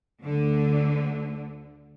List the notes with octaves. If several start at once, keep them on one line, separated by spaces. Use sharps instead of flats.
D2 D3